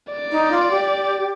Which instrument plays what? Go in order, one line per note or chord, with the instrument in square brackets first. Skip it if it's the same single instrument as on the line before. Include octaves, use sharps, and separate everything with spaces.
[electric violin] D5
[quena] D#4
F4
G4